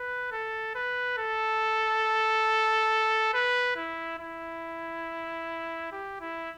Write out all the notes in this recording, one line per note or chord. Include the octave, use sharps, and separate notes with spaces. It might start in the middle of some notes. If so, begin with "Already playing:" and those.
Already playing: B4
A4
B4
A4
B4
E4
E4
G4
E4